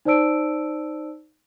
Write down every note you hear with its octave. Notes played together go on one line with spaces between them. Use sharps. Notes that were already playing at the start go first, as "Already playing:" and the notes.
D#4 C5 D5 A5 E6 D7